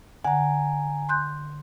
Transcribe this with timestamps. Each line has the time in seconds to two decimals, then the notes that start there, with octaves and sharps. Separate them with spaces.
0.25 D3 F#5 G#5 A#5
1.09 C6 F#6 G6